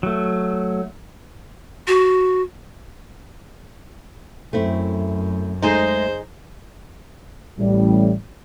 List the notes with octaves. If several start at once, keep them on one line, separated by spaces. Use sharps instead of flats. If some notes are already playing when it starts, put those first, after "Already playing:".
F#3 A3
F#4
F#2 A3 C4 E4
G#3 A3 D#4 G#4 C5
A1 A2 G3